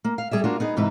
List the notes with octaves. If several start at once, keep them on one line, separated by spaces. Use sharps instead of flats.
A#3
F5
G3 G#4 D5 E5
A#3 D4 F4 F#4
B3 D#4 G#4
G#2 C3 E3 D#4 E4 B4